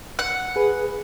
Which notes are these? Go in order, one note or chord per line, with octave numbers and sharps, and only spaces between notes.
F#5
G#4 B4